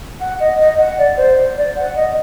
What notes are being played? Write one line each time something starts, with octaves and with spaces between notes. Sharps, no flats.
F#5
D#5
D#5
F#5
D5
C5
D5
F#5
D#5